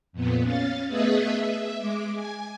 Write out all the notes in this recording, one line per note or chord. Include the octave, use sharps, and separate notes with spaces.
F2 A#2 B3
C#4 F5 A6
A3 B3 G#4 B4 D#5 E5
E5
G#3 D6
G#5